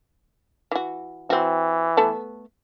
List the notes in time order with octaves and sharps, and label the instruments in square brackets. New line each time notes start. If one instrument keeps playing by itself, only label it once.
[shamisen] E3 F#4
[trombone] E3 [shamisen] C4 F#4
[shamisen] A3 B3 A5